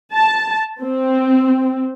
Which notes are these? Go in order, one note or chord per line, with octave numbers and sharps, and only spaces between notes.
A5
C4